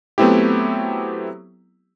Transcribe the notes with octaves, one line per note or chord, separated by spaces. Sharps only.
F#3 A3 B3 C4 E4 G4